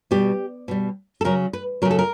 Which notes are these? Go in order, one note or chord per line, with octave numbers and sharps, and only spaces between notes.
B2 G3 G4
B2 G3
A4
C#3 F#3 A#4
B4
C#3 F#3 A#4
A4
A#4